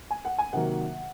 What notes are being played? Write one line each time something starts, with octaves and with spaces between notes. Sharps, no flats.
G#5
F#5
G#5
C3 D#3 F#3 A#3 F#5